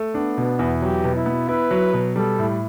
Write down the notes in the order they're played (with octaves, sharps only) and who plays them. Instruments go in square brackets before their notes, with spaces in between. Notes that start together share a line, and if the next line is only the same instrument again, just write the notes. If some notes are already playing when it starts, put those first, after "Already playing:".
Already playing: [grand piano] A3
[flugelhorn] B3 [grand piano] D4
[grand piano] B2
E2
[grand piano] F#3 [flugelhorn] G4
[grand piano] B2
[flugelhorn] E4
[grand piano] B3
[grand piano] E4 [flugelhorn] B4
[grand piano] F#3
B2
[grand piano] G3 [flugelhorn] A4
[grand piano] A2